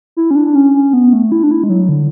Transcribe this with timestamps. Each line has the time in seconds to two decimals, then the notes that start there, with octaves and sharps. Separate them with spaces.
0.17 E4
0.31 C#4
0.35 D4
0.46 D4
0.55 C#4
0.74 C#4
0.93 B3
1.13 A3
1.32 E4
1.43 D4
1.51 E4
1.64 G#3
1.69 F#3
1.89 D3